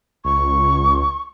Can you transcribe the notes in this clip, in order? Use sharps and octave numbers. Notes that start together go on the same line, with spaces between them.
C#2 C#6